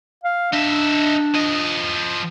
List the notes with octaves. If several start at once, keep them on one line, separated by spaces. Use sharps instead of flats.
F5
D4 D#4 E5
F3 D#5